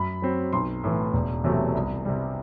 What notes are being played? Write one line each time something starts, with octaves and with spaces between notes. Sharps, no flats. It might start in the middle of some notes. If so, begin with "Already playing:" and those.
Already playing: F#2 B5
F#3 C4
B1 C6
A2 E3
E1
E2 C3 F#3 A3
C2
C3 G3